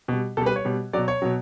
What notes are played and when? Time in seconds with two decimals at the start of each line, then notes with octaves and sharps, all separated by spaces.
0.08 B2 G3
0.37 B2 G3 A4
0.46 B4
0.56 C#5
0.65 B2 G3
0.93 B2 F#3 D5
1.08 C#5
1.22 B2 F#3